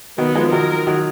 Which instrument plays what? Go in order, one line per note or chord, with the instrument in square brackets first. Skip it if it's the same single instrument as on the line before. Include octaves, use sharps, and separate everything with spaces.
[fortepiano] D#3 F#3 [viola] B3
[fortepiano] F3 G#3
[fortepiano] D#3 F#3 [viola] A#4
[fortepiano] D#3 F#3